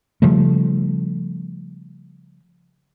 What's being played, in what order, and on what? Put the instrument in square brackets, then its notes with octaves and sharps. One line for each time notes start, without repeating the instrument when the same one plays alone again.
[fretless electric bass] C#3 F3 G3 A3